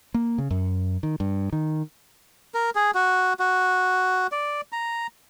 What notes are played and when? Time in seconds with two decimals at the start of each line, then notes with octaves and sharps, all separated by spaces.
0.14 A#3
0.38 C#3
0.51 F#2
1.03 D#3
1.20 G2
1.53 D#3
2.54 A#4
2.75 G#4
2.95 F#4
3.40 F#4
4.32 D5
4.72 A#5